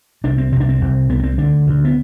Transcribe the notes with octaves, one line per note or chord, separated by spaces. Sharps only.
C2 C3 D4
C4
C2 C3 C4 D4
C4
C2 C3
C2 C3 B3
B3
C4
D2 D3 D4
D2 D3
B3